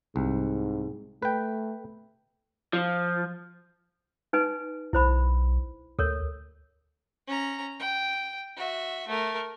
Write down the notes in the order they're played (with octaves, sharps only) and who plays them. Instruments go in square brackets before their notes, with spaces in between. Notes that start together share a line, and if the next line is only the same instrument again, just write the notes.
[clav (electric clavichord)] C2 [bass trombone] G#2
[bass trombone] A3 [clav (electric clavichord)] B4 G5
[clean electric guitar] F3
[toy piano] D#4 B4 G#5
[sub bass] B1 [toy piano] E4 C5 B5
[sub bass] D2 [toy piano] A4 A#4 C#5
[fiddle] C#4 A#5
G5
F#4 E5
A3 A#4